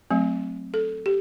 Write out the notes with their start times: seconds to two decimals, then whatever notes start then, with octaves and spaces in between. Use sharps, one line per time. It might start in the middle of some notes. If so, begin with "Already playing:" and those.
0.11 F#3 A3 C4
0.74 A4
1.06 G4